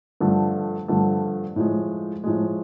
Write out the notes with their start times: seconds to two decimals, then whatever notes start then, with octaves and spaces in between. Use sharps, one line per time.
0.21 G2 D3 F3 A3
0.88 G2 D3 F3 A3
1.56 A2 F3 G#3
2.24 A2 F3 G#3